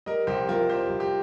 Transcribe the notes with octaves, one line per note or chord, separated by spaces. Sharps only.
G3 A#4 D#5
C2 G4 C5
C2 F4 A#4
G3 G4 C5
C2
G4